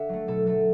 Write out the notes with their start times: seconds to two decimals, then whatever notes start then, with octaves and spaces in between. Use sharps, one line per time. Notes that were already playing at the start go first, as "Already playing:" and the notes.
Already playing: D3 E5 F#5
0.09 F#3 A3
0.28 B2 A4
0.46 F#3 A3 A4